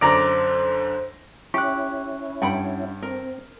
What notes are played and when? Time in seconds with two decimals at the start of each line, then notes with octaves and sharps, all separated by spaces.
0.01 F#2 D3 C5 D5 A#5 D6 D7
1.54 C#4 E4 G4 C#6 F#6
2.42 G2 F#5 G5 B5
3.02 C4 A#4